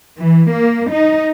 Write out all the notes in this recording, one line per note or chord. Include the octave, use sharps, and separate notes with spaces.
E3
A#3
D#4